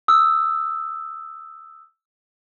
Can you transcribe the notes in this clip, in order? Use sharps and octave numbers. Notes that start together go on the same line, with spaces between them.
D#6 E6